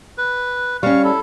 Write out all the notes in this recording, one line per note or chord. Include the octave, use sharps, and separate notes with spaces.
B4
G3 C#4 F5 C#6
E4 A4